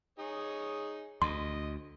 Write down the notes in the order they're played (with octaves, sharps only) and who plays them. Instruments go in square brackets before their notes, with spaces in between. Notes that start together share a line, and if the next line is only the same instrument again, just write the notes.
[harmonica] D#4 G#4 C#5
[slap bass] D2 [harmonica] D#5 [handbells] C6